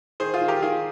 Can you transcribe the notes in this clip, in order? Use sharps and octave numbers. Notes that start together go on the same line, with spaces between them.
D#3 G#4 C5
F4 G#4
D#3
G4 A#4
D#3 F4 G#4